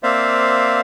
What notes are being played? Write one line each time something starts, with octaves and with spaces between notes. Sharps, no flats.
A#3 C4 C5 D5 E5 F5